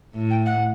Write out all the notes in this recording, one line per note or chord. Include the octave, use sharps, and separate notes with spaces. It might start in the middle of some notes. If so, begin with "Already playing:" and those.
A2
G5
F#5